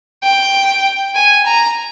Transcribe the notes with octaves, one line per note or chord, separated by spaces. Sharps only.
G5
G#5
A#5